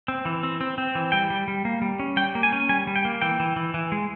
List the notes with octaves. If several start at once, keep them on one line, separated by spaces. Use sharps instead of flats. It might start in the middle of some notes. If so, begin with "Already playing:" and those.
C4
E3
C4
C4
C4
E3
G3 G5
G3
G3
A#3
G3
C#4
G3 G5
A#3
G#5
C#4
G3 G#5
G3
G5
A#3
E3 G5
E3
E3
E3
G#3